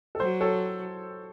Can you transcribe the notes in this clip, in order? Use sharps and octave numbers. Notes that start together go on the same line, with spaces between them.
A4
F#3 C5
A4 C#5